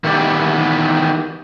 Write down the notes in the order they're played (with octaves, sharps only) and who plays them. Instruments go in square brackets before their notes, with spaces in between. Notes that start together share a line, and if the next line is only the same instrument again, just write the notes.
[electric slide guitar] D#3 E3 B3 G4 D5